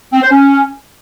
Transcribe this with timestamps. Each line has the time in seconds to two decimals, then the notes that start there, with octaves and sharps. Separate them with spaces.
0.13 C4
0.22 C5
0.31 C#4